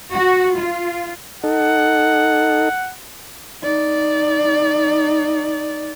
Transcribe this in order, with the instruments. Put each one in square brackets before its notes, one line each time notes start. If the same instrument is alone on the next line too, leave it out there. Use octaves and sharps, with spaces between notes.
[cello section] F#4
F4
[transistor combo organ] D#4 A4 [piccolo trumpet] F#5
[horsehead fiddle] D#4 D5